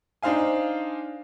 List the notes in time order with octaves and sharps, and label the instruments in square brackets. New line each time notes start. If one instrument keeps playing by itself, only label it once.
[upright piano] D4 D#4 C5 F5 G#5